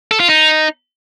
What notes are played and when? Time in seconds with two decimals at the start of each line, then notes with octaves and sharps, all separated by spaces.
0.11 A4
0.20 F4
0.29 D#4